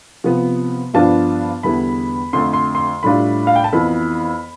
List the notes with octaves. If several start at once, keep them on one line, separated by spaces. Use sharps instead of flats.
C3 F3 B3
G2 F3 B3 D4 F4 A5
E2 D3 G3 B3 E4 B5
F2 D3 A3 C6
C6
C6
A2 G3 D4 F4 B5
F5
G5
A5
F2 E3 B3 B5